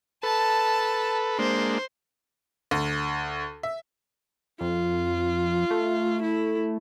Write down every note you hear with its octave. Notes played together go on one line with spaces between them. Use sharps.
A4 B4 A5
G#3 A#3 D4 C5
D2
E5
F2 F4
A3
E4